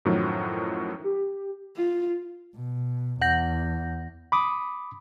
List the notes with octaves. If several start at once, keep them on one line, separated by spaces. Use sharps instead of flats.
F#2 A2 D#3 F3 F#3
G4
F4
B2
E2 F#5 G6 A#6
B5 D6 D#6